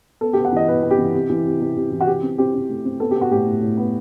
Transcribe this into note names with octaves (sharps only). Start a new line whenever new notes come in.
B3 A4
B3 G4
F#5
E3 D#5
B3 B4
B3
G4
E3
C3
E3
C3
C3
C3
E3
F#4
C3 G4
C4
C4 G4
C4
A3
C4
B3 A4
G4
B3
F#4
A2 G4
A2
A2
B3